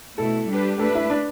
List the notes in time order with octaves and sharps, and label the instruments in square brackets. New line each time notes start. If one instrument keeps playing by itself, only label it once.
[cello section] B2 A3 E4 [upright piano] A4
[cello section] G3 D4 G4 B4
[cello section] A3 D4 B4 [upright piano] A4
[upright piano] E4
D4